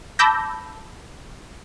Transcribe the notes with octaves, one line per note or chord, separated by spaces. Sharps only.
A5 B5 D6 E6 G6 A#6